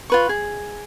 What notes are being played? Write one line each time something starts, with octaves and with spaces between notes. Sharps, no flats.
F4 B4 C#6
G#4